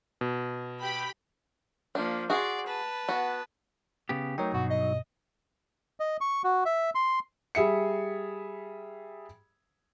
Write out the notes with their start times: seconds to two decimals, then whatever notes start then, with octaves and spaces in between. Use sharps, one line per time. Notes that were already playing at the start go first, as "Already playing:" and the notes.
0.21 B2
0.81 G4 G5 B5
1.95 F3 A#3 D4
2.30 F#4 G#4 D5 C6
2.66 B4 A5
3.09 B3 F#4
4.09 C#3 B3 G4
4.38 F#3 A3 D#4 A#4 C#5 G5
4.54 G2 B2 F#4
4.70 D#5
6.00 D#5
6.21 C#6
6.44 F#4
6.66 E5
6.95 C6
7.55 G3 G#4 E5 C#7